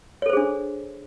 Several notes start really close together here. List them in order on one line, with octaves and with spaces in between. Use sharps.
C#5 A4 C5 G#4 D4